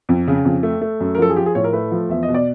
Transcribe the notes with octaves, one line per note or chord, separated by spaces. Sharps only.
F2
C#3
F2
A3
A3
F#2
A#4
F3 A4
G#4
F3 G4
G#4
A2 C#5
A#4
A3 B4
F3
E2 E5
D#5
B2
D5